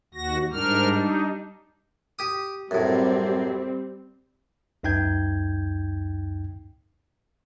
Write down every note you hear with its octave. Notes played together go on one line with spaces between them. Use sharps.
D#2 F#4 A#6
G#2 G3 D4 A#4 F6
D#4
G4 D#6
F#2 A2 G3 C4
C#2 F#2 D#4 G5 G6 G#6